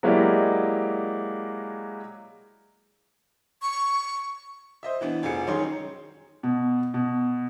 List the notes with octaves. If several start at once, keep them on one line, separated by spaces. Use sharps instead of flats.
F#3 G#3 A#3 E4 G4 D5
C#6
C5 D#5 E5
E3 B3 D4
F1 F3 G#4 C#7
D#3 F#3 C#4 D#4 G#4 C6
B2
B2